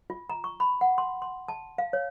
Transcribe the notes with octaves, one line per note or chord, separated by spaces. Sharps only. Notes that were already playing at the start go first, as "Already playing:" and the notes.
F4
A#5
C#6
B5
F#5
C6
C6
A5
F5
C#5